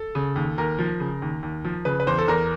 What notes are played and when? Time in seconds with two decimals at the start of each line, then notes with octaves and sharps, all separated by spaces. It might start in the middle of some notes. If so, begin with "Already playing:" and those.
Already playing: A4
0.15 C#3
0.36 D#2
0.58 D#2 A#4
0.79 F3
1.00 C#3
1.22 D#2
1.43 D#2
1.65 F3
1.85 C#3 B4
2.00 B4
2.07 E2 C5
2.18 A4
2.28 E2 A#4